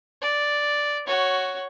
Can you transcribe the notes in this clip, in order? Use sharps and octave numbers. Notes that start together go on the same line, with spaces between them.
D5
F#4 C#5